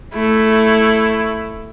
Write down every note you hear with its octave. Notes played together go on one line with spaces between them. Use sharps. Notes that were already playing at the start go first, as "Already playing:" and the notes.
A3 E4